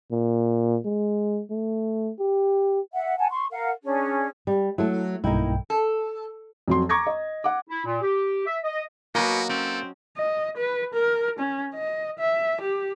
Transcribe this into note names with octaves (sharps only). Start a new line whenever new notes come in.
A#2
G#3
A3
G4
E5 F#5
F#5 G#5 A5
C6 C#6
A#4 F5 F#5
C#4 D4 G#4
G3
F#3 A3 E4 A4
B1 G2 A#3 D#4 E4 G5
A4
F2 F#3 C6
A#5 C#6 D6 G#6 A#6
D#5
F#5 D6
E4
A#2
G4
E5
D#5
B2 F#3 A#3 F#4 D#5
C4 C#4 A4
D#5
B4
A#4
C#4
D#5
E5
G4